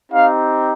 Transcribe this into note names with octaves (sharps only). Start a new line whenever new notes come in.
C4 D#4 G4 F5